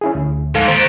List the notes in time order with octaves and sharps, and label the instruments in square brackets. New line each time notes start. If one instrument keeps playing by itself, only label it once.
[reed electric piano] C#4 E4 G#4
D2
[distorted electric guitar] G#2 [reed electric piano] A4 F5
[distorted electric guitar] D#3 G4 [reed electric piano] C5 A6